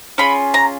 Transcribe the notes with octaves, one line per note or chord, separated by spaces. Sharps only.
C#4 F4 G#4 B5
A#5